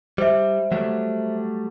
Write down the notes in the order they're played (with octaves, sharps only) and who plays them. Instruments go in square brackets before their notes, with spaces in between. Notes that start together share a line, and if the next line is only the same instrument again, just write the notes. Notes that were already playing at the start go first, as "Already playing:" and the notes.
[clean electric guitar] G3 [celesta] C5 E5
[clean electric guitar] F#3 G3 A3